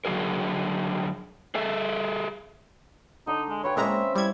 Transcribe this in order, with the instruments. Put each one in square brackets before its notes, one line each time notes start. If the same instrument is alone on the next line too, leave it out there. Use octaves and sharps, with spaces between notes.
[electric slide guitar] D3 F#3 F#4 G#4 A#4
G#4 A4 E5
[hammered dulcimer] D3 [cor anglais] D#4
[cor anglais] G#3
[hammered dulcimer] F4 B4 G5 [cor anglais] C#5
[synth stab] A#2 G#3 A#5 [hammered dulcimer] C4 C#4 [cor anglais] E5
[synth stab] G3 G#6 [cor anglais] E4